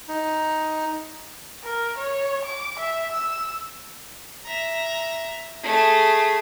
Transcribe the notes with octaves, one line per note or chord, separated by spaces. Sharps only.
D#4
A#4
C#5
D6
E5
E6
E5 A#5
A3 G#4